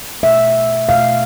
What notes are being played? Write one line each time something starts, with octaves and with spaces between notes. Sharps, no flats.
B2 A3 E5
B2 A3 F5